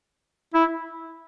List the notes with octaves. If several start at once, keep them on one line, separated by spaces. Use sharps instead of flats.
E4